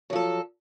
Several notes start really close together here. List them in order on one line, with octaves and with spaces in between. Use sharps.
F#3 F3 A4